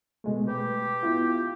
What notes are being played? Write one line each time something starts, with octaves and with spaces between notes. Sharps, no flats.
B2 G#3 A3
G4 B4
B3 E4 F4